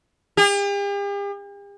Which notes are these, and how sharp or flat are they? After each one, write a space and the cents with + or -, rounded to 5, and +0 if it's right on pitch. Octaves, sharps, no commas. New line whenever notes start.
G4 +45